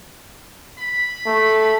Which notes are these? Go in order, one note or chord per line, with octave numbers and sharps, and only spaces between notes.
B5
A3